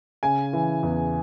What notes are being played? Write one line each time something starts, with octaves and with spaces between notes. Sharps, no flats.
C#3 G#5
E3
E2